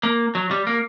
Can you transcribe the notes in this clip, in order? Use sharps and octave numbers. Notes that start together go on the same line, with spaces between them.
A#3
F#3
G3
A#3